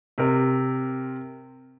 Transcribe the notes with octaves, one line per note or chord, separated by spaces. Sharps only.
C3 A#4